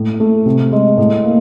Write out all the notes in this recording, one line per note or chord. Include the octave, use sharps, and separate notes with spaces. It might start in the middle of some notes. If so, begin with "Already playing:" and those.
Already playing: A2
A3
C3
G#3
A2
A#3